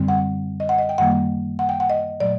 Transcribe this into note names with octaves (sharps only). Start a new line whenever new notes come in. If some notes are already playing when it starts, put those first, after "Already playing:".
Already playing: F#2 D3 G3 C4
F#5
D#5
F#5
D#5
G5
F#2 D#3 G3 A#3 F#5
F#5
G5
F#5
D#5
A#2 F#3 A3 D5